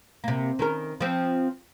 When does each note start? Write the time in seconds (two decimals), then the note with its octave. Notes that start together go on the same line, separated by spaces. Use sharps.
0.24 C3 A#3
0.59 D#3 C#4 A#4
1.01 F3 C4